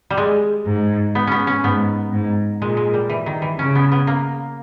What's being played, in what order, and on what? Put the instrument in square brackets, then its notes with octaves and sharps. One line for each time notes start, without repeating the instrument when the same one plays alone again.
[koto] G3
G#3
[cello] G#2
[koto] B3
B3 C#4
C#4
[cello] G#2 [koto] B3
[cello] G#2
[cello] A#2 [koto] G#3
[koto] G#3
G3
E3
D#3
E3
[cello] C#3 [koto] C#4
[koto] B3
B3
A#3